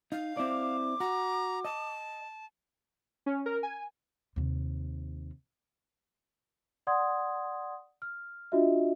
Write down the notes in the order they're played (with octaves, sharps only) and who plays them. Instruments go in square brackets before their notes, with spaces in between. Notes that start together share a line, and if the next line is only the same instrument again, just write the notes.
[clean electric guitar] D#4 [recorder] F5
[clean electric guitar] C4 E4 D5 [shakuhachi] D6
[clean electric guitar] F#4 [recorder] A#5
[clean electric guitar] D#5 [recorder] A5
[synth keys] C#4
A#4
G#5
[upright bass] D#2 C3
[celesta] D5 F#5 C6 D#6 G#6
F6
D4 F4 F#4 D#5 E5